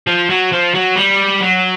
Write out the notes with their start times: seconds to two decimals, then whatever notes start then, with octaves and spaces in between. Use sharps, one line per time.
0.07 F3
0.30 F#3
0.52 F3
0.74 F#3
0.96 G3
1.41 F#3